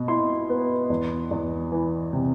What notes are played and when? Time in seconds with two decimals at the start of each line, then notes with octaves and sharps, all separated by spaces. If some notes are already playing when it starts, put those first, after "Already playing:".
Already playing: B2
0.08 E4 C6
0.50 B3
0.90 E2
1.31 E2
1.72 E3
2.13 C3